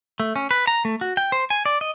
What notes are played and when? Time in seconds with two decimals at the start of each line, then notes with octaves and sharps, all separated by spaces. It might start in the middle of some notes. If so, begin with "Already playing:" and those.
0.20 A3
0.36 C#4
0.51 B4
0.67 A#5
0.85 A3
1.01 F#4
1.17 G5
1.32 C5
1.50 G#5
1.66 D5
1.81 D#5